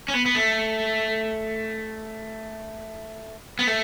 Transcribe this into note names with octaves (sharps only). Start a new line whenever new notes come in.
C#4
B3
B3
A3
B3
A3